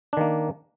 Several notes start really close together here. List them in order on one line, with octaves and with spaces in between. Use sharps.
D4 D#3 A#3